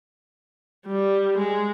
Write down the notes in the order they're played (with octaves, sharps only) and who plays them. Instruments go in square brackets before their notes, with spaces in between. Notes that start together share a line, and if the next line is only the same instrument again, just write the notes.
[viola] G3
G#3